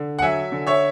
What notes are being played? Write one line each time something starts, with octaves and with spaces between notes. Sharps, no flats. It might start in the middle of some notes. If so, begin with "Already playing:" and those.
Already playing: D3
F#5
F#3 E5 G#5
D3
C#5 E5